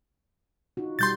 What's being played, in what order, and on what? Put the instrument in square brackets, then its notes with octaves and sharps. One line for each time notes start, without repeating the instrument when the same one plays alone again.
[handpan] D#4 F4 F#4
[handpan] B2 G3 G4 [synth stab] C6 G6 A6